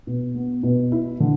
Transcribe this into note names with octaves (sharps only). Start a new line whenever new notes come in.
B2
B3
B2
E4
D3